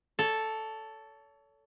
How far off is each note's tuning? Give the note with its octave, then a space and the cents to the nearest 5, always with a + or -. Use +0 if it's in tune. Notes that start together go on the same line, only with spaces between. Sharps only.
A4 +0 C#5 +35